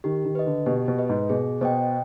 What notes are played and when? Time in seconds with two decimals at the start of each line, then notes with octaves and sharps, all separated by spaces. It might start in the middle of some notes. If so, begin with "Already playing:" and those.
0.04 D#3 G4
0.25 D#3
0.35 B4 D#5
0.46 D3
0.66 B2 G4
0.88 B2
0.99 B4 D#5
1.09 G#2
1.30 B2 G#4
1.61 B2 C5 D#5 G5